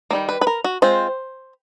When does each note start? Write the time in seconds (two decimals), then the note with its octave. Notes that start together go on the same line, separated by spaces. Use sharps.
0.11 D#3 G3 A#3
0.29 B4
0.41 B4
0.47 A#4
0.64 F#4
0.82 G#3 C4 F4 C5